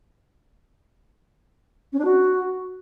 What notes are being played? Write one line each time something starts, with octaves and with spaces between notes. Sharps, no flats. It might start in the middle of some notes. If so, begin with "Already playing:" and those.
C#4
D4
F#4